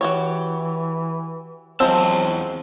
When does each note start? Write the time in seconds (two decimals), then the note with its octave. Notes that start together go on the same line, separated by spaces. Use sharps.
0.01 E3 F#4 G4 C#5
1.80 E2 F3 F#3 G#3 C4 A5